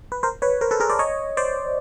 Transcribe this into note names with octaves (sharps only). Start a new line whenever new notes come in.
B4
A#4 C5
B4 C#5
A#4 C5
A4 B4
G#4 A#4
C5 D5
C#5 D#5
C5 D5